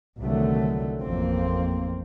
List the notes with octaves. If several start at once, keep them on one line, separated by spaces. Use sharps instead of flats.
C2 D3 D#3 F#3 A3
A1 F2 A#3 C4